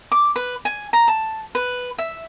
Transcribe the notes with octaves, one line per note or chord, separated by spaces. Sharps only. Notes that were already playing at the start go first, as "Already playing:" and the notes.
D6
B4
G#5
A#5
A5
B4
E5